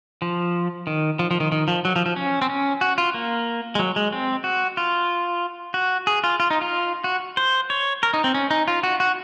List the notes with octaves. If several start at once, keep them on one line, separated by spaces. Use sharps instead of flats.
F3
D#3
F3
F3
D#3
D#3
F3
F#3
F3
F3
C#4
C4
C#4
F#4
F4
A#3
G#3
F#3
G#3
C4
F#4
F4
F#4
G#4
F4
F4
D#4
F4
F#4
C5
C#5
A#4
D#4
C4
C#4
D#4
F4
F#4
F#4